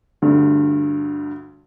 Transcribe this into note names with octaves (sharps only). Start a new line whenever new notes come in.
D2 G2 D3